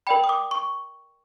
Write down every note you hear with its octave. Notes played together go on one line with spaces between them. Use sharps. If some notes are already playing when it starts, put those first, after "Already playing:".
A#4 D5 G5 B5
D#6
D6
C#6